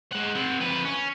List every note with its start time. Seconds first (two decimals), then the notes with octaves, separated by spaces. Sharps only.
0.12 G#3 F#5
0.35 C4 F#5
0.60 F2 B4
0.85 C#4